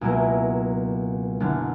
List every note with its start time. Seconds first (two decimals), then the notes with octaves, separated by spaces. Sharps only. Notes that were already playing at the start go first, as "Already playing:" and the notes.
0.01 C#2 B2 F#3 A#3 E4
1.40 F#1 F#2 D3